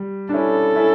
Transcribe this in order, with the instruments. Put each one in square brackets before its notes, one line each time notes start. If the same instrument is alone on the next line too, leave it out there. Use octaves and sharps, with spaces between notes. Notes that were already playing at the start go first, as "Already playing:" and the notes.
Already playing: [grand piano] G3
D4
[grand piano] C#4 E4 [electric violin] A4
[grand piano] C#4 E4